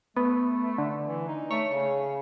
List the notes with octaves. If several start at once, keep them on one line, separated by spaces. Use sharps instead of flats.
A3 B3
D3
E3
D#4
A3 C#5
C#3